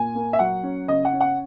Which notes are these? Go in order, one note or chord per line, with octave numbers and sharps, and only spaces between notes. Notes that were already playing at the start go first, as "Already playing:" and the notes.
Already playing: A#2 G#5
A#3
E5
F#3 F#5
C#4
C#3 D#5
F#5
C#4
F#5